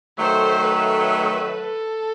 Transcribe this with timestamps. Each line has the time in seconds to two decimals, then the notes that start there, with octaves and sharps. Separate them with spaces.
0.18 D#3 F#3 A3 C5
0.65 B4
1.57 A4